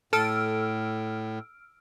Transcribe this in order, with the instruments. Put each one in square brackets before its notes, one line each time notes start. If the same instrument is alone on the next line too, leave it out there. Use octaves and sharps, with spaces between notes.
[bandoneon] A2 [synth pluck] A4 [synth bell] E6 F6 D7